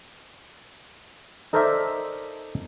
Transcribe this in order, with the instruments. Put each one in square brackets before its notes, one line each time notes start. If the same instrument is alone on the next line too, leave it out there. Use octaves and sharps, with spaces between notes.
[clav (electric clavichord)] D#4 A4 A#4 C5 D5 E5